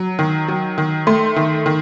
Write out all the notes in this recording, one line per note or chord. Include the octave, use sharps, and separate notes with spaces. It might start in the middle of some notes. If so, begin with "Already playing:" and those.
Already playing: F#3
D#3
F#3
D#3
A3 C6
D#3
D#3